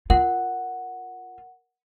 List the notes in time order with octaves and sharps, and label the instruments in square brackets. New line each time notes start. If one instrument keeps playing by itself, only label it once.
[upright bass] F4 [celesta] A#4 F#5